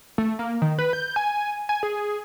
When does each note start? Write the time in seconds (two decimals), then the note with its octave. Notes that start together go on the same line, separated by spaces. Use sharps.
0.18 A3
0.39 A#3
0.62 D#3
0.79 B4
0.93 G6
1.16 G#5
1.69 G#5
1.83 G#4